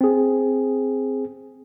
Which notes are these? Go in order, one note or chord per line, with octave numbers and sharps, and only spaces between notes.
C4 G#4